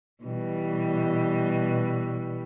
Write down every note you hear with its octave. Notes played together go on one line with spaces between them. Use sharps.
B2 E3 G3